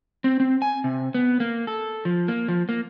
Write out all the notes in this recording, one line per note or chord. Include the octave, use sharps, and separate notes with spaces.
C4
C4
G#5
C3
B3
A#3
A4
F3
A#3
F3
A#3